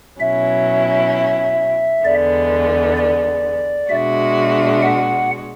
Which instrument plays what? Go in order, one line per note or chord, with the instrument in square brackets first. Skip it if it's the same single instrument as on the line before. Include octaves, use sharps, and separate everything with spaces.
[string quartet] B2 F#3 C#4 E4 [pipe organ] E5
[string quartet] E2 D3 G#3 B3 [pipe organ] D5
[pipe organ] D5
[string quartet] B2 G#3 D4 F#4 [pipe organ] E5
[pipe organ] F#5